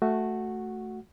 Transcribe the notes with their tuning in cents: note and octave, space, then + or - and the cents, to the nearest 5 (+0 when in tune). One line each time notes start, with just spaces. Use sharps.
A3 +0 F#4 +0 F#5 +0